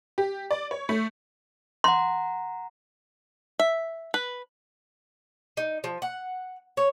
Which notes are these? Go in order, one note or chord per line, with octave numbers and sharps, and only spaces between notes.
G4
D5
C#5
A3
F#5 A#5 C6
E5
B4
D#4
F3
F#5
C#5